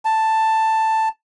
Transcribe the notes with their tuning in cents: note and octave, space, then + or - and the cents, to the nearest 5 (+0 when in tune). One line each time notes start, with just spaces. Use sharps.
A5 +5